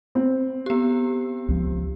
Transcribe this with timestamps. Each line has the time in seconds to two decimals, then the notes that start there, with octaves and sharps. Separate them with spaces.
0.15 C4
0.66 B3 G4
1.49 C#2 F3